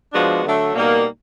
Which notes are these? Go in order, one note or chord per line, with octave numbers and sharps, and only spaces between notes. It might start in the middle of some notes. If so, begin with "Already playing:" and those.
F3 G#3 B3 D4 F#4
D3 F#3 A3 D4
B2 G3 A#3 D#4